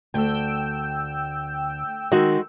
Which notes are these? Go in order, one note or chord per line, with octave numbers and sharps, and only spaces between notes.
D2 G5 E6
D#3 G#3 F#4